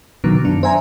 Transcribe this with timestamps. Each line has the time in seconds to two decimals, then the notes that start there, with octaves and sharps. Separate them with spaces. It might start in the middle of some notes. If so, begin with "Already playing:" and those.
0.24 B2 D3 D#3 F#3 B3
0.45 F#2 D4
0.63 C5 E5 G#5 A#5